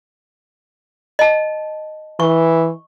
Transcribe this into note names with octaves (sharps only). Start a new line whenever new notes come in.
D#5 A5
E3 C#6